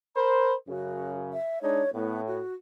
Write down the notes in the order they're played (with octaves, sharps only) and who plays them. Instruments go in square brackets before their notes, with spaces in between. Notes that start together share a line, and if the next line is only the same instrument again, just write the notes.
[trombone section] A#4 C5 [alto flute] B5
[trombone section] F#2 C#3 [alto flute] F#4
[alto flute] E5
[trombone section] G#3 D4 D#4 [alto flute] C#5
[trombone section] A2 [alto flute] B3
[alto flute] F#4